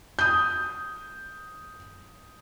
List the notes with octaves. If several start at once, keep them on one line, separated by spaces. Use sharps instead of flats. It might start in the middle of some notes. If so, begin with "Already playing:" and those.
D#6 G6